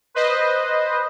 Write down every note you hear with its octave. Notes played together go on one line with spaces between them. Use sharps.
B4 C5 D#5